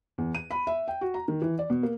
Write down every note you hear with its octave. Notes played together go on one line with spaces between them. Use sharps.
E2
D#7
B5
E5
G5
F#4
A#5
D#3
E3
D5
B2
A#3